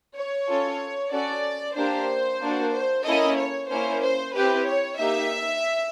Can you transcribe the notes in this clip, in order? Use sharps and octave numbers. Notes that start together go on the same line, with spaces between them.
C#5
C#4 F4 A4
C#4 F#4 A4 D5
A#3 D4 G4 C5
A#3 D4 F#4
C5
A#3 C#4 E4 A4 D#5
C#5
A#3 C#4 E4 C5
C5
C4 E4 G4 B4
C#5
A#3 D#4 G4 E5